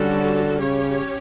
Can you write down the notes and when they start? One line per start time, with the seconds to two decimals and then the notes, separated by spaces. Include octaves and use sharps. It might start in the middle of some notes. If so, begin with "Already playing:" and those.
Already playing: D3 G3 C#4 F#4 A4
0.60 C#3 C#4 G4 C#5